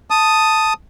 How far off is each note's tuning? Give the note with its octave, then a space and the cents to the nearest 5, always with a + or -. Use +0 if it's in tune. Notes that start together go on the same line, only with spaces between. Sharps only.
A5 +0 D#6 +0